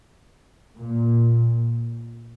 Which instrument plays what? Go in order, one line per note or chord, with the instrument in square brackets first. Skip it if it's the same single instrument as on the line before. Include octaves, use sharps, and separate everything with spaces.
[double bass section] A#2